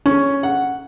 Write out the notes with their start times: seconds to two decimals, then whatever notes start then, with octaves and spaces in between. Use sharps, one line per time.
0.06 C#4
0.43 F#5